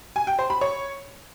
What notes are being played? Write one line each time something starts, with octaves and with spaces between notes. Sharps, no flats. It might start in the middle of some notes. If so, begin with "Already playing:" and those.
G#5
G5
C5
B5
C#5